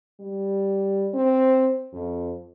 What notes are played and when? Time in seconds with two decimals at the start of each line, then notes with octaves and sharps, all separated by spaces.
0.20 G3
1.14 C4
1.93 F2